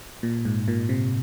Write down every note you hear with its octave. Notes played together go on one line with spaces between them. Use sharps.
A#2
G#2
A#2
C3